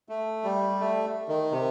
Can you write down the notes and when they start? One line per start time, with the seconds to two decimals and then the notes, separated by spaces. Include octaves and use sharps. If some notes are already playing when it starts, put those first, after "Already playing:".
0.09 A3
0.44 G3
0.80 A3
1.28 D#3
1.52 C3